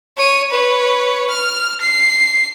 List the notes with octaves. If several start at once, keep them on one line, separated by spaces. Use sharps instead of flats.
C#5 D#7
B4 C#5
F6
C7